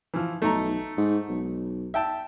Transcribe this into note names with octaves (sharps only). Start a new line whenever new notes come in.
E3 F3
B1 A3 D#4 A#5
G#2
B1
E5 G5 A5